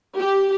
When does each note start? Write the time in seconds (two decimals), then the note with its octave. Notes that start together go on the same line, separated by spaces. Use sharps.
0.19 G4